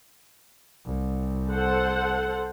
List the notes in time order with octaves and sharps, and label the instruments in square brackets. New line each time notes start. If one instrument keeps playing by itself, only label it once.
[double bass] C2
[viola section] A4 C5 F#5